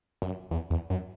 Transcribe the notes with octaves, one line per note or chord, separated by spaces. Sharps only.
F#2
E2
E2
F#2